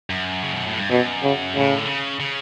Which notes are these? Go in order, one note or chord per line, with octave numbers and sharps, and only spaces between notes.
F#2
C#3
B2
A2
G2
F#2 B2
C#3
A2 C#3
D3
C#3
C#3